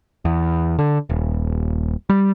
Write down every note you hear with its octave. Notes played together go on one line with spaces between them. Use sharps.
E2
D3
D#1
G3